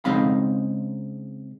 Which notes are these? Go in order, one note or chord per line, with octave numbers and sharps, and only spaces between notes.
C#3 G#3 C4 D#4 F5 B5